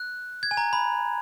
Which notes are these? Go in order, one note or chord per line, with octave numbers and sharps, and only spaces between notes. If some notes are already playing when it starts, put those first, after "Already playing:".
Already playing: F#6
G#6
G#5
A#5
B5